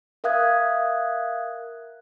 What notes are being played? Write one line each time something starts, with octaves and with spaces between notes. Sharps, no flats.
A#4 E5 F5 D#6 F#6 G#6